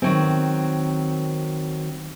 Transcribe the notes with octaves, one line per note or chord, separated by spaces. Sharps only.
D#3 F#3 C4